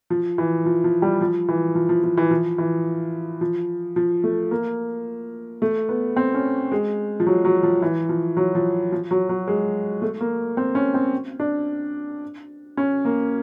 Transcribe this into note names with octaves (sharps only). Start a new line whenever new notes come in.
F3
E3
F3
F3
G3
F3
E3
F3
F3
F3
E3
F3
E3
F3
F3
A3
A#3
A3
B3
C4
C#4
G#3
F3
F#3
F#3
F3
E3
F3
F#3
F3
F3
F#3
F#3
G#3
A3
A#3
C4
C#4
C4
D4
C#4
A#3